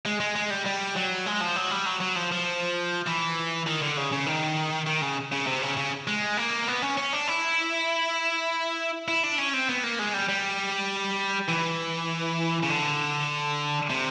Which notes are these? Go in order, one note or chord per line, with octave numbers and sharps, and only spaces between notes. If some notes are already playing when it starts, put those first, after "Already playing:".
G#3
G#3
G#3
G3
G3
F#3
G#3
F3
F#3
G3
F#3
F#3
F3
F3
E3
D#3
D3
C#3
C#3
D#3
D#3
C#3
C#3
C3
C#3
C#3
G#3
A#3
B3
C#4
C#4
D4
E4
E4
D4
C#4
C4
B3
A#3
G#3
G3
G3
E3
C#3
D3
C3